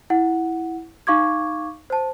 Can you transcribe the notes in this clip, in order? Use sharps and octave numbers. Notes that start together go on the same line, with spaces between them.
E4 F#5
D#4 F5 C#6 D6 G#6
C5 A5